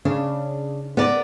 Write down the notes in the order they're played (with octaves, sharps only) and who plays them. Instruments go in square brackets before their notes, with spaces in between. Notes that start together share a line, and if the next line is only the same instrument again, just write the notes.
[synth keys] C#3 [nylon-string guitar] D4
[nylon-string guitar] B3 A#4 D5